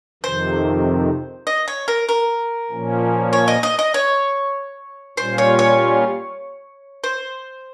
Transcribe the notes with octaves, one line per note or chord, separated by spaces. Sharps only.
F2 C3 D#3 C5
D#5
C#5
A#4
A#4
A#2 F3 A#3 C#4
C#5
D#5
D#5
D#5
C#5
A#2 G3 C#4 F4 C5
C#5
C#5
C5